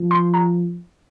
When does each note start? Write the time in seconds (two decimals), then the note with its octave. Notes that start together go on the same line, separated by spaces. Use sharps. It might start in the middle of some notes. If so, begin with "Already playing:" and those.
Already playing: F3
0.11 C6
0.34 A#5